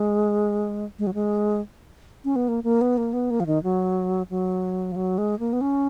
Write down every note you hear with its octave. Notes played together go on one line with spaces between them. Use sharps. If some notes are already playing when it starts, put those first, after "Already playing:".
Already playing: G#3
G#3
F#3
G#3
C#4
B3
A#3
A#3
B3
A#3
B3
A#3
F3
D#3
F#3
F#3
F3
F#3
G#3
A#3
B3
C#4